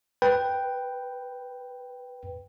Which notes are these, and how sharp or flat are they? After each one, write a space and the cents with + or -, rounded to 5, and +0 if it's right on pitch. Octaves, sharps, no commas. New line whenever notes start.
B4 +0 G5 +0